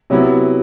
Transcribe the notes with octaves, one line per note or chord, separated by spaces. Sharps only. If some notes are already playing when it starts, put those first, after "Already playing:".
C3 F#3 B3 E4